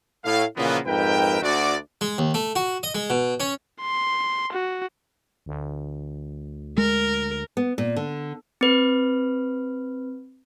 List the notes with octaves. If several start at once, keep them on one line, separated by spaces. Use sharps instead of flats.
A2 F5
A#2 C#3 E3 F3 A#3 B3
F2 G#2 A#4 B4 E5 G5
D2 F#4 D5
G#3
D#2
A3
F#4
D#5
G#3
B2
C#4
C6
F#4
D2
G#3 A#4
B3
A#2
D3
C4 B4